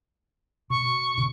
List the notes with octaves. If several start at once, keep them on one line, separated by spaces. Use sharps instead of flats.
B2 C#6
B2 D3